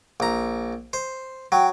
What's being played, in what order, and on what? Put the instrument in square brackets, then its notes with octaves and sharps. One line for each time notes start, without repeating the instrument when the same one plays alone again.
[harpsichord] A#1 A#5
C5
[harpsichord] F#3 [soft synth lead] G5